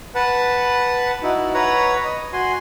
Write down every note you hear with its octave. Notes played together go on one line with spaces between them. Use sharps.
B4 F#5 A5
D#4 E4 F#4
B4 C#5 F#5 A#5
D#5
F#4 G#5 C6